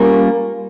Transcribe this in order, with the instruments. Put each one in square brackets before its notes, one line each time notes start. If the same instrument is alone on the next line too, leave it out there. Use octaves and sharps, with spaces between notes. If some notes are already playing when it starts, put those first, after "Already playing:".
Already playing: [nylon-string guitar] G3 A#3 C#4 F4 A#4